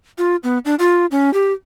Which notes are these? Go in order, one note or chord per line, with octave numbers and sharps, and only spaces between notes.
F4
B3
D4
F4
C#4
G4